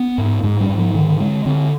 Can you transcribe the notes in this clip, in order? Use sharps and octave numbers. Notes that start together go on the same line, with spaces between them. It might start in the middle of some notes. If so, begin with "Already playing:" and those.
Already playing: B3
G#2
G#2 G#3
G3
G#2
F3
D3 D#3
D3 G#3
D3 C4